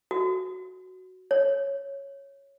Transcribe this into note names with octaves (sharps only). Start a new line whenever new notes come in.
F#4
C#5